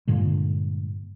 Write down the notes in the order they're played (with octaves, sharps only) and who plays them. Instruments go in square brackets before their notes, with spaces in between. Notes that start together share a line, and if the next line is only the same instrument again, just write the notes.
[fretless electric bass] G2 A#2 D3 G#3